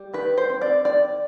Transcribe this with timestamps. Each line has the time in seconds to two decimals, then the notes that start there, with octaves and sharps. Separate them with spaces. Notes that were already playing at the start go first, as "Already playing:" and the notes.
Already playing: G3
0.14 D#3 B4
0.38 C5
0.50 C4
0.62 D5
0.85 D#3 D5